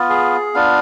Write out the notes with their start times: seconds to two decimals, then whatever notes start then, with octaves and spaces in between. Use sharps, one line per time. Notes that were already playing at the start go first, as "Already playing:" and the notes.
Already playing: B3 F4
0.10 G#4
0.54 B3 D4 F4 F5